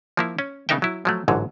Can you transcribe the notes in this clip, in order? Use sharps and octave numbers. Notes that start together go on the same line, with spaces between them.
F3 A#3 E4
C#4
C#3 B3 D#4 A#4 E5 G5
F#3 E4
F3 F#3 A3
A1 G#2 D3 F#3